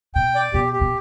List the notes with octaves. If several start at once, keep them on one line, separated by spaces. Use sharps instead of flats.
B2 G5
D5
B2 G4
G4
B2